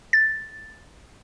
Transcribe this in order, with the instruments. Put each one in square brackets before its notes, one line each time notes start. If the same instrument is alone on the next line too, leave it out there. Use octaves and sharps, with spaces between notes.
[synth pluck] A6